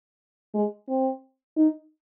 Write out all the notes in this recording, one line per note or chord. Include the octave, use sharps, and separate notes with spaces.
G#3
C4
D#4